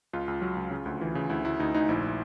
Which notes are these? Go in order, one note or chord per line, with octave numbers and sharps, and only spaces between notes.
C#2 F4
C#2
F#3
C#2
C#3
D2
E3
C#3
D2 E4
D2 E4
D2 D#4
D2 D#4
A#1 E4